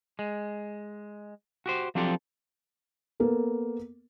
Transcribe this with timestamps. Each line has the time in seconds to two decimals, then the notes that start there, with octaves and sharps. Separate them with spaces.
0.19 G#3
1.66 F#4 G4 C5
1.95 F3 F#3 C4 D4 G4 A4
3.20 A#3 B3 A4 A#4